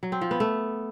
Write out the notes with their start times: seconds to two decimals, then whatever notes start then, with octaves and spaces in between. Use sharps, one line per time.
0.03 F#3
0.12 C4
0.21 F3
0.31 B3
0.40 A3